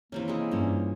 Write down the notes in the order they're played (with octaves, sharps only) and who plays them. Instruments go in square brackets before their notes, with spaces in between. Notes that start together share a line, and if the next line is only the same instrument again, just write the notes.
[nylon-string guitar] C3 [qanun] E3 C4 C#4 [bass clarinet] A#3
[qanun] G#3 E4 G#4
[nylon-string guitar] G2 A#2 C#4